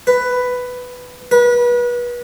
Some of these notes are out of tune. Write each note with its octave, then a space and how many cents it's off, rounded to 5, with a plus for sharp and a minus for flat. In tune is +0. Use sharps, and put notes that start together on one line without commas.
B4 +10
B4 -30